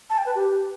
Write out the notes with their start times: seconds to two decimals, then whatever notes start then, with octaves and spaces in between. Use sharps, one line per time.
0.10 A5
0.18 G5
0.26 B4
0.35 G4